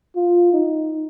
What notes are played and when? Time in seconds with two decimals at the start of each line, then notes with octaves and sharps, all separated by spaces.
0.16 F4
0.53 D#4